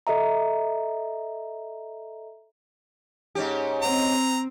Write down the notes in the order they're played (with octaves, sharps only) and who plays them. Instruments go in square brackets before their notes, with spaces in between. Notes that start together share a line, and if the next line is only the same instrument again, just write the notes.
[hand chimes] A4 D#5 E5 A#5
[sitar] G#2 C#4 G4
[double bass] C4 [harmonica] A#5